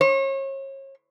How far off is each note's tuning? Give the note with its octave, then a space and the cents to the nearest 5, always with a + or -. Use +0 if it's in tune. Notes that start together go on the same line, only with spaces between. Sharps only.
C#5 -35